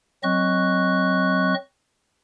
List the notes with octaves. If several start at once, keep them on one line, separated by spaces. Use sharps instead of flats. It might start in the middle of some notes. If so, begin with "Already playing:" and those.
F#3 C4 D#5 C#6 F#6